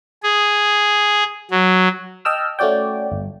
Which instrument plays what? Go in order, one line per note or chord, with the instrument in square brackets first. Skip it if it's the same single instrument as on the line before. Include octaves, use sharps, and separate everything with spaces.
[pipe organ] G#4
F#3
[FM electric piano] D#5 G5 A5 E6 F6
A3 C#4 F#4 D5 G5
G1